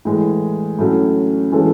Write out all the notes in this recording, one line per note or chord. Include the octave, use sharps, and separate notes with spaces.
A2 E3 G#3
A2 F#3 A3 C#4
E3 G#3 C#4 F#4 A4